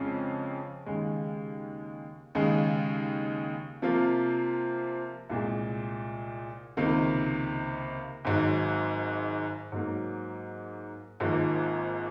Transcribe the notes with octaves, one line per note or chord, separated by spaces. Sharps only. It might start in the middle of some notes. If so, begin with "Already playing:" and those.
Already playing: F2 C#3 G#3 C#4 F4
D#2 C#3 G#3
D#2 C#3 G#3
C3 F3 A#3 F4
C2 A#2 G#3
C#2 C3 D#3 A#3
G#1 G#2 F#3
G#2 F#3 A#3
G#1 G#2 F3 A#3